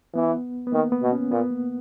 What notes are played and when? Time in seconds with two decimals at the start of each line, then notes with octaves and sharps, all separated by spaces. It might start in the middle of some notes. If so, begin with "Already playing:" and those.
0.15 E3 B3
0.67 B3
0.73 D#3 A#3
0.92 B3
1.03 B2
1.13 C#4
1.31 A#2 B3
1.51 A#3